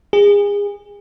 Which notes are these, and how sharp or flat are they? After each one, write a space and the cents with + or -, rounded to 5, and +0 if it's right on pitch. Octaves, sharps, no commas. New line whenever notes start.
G#4 -30